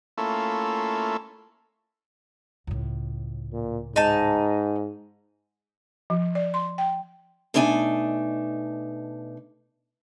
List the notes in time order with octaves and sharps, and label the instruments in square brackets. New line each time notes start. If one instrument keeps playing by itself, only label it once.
[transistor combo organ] A3 A#3 C#4 E4 F4 A4
[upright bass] C#2 A2
[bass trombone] A#2
[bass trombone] G#2 [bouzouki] D#4 A5
[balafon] F3
D5
C6
G5
[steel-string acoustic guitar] B2 A3 D4 D#4 G#5